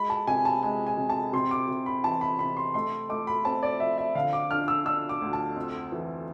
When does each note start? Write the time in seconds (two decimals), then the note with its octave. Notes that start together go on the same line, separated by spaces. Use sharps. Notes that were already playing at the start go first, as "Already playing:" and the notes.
Already playing: G#3 B5
0.10 A5
0.27 C3 G#5
0.45 A5
0.63 G#3 G#5
0.87 G#5
0.97 C3
1.10 A5
1.33 C3 C6
1.51 D6
1.68 C3
1.86 B5
2.04 E3 A5
2.21 B5
2.39 C3 B5
2.57 C6
2.74 A3 C6
3.09 A3 D6
3.27 B5
3.45 C4 A5
3.63 D5
3.80 F3 E5
3.98 E5
4.15 D3 F5
4.33 D6
4.50 D4 F6
4.68 E6
4.85 D4 E6
5.09 D6
5.22 D2
5.33 A5
5.56 F2
5.92 E3